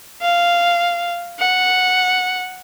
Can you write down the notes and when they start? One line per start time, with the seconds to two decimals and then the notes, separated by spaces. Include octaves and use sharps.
0.21 F5
1.39 F#5